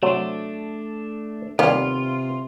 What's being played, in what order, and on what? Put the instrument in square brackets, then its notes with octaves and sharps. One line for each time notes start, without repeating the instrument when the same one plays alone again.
[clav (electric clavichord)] C3 F#3 [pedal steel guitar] A3 D4
[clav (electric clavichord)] D#2 G3 [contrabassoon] C3 [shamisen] A#3 B3 G4 [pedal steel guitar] F4